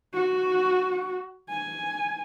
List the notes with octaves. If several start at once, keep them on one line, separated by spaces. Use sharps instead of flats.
F#4
G#5